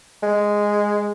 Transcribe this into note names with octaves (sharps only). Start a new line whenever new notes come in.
G#3